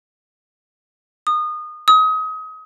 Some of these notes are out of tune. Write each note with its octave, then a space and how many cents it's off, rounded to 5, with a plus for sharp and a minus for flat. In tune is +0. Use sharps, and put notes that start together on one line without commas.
D#6 -25
D#6 +30